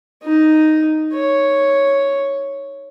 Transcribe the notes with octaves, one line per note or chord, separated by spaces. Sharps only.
D#4
C#5